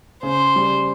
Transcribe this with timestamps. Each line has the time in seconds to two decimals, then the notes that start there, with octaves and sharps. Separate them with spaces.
0.23 C#3 C5
0.56 G3